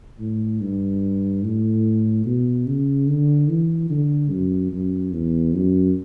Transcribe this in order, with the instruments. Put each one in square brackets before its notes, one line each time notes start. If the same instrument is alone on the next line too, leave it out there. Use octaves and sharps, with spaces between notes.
[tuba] A2
G2
A2
B2
C#3
D3
E3
D3
F#2
F#2
E2
F#2